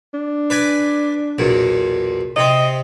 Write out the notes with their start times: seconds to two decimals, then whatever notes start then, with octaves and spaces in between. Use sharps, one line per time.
0.14 D4
0.50 B4 D5 G#5
1.38 B1 E2 A#2
2.36 C3 C4 D#5